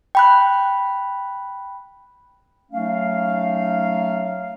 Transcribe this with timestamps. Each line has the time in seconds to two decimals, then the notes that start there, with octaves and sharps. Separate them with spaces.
0.15 G5 B5 F#6
2.71 F#3 A3 C#4 D#4 F5